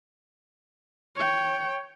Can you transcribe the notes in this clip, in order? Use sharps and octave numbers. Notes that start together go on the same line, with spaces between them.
C#5 G5